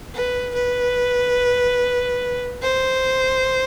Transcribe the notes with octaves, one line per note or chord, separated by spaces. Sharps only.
B4
B4
C5